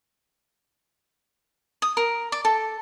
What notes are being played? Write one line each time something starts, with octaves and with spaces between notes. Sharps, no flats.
D#6
A#4
D5
A4